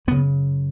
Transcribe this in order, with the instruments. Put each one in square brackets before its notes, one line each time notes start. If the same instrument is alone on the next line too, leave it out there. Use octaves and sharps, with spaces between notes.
[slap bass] F#2 C#3 B3